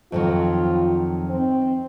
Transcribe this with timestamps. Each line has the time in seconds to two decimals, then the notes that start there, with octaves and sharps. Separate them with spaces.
0.12 F2 D#3 F#3 F4
1.29 C4